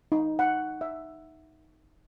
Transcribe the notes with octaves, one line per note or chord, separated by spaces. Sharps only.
D#4
F#5
E5